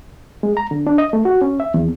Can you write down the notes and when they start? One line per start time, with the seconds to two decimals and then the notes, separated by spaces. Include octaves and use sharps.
0.43 G#3
0.57 A#5
0.71 D3
0.87 D4
0.98 D#5
1.13 A3
1.25 F#4
1.41 C#4
1.60 E5
1.74 E2